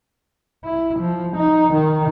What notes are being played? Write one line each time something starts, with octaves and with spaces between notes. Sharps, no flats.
E4
F3
D#4
D#3